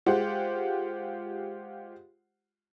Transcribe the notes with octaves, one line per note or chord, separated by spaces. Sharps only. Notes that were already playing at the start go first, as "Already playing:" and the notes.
G#3 F4 G4 C5 F#5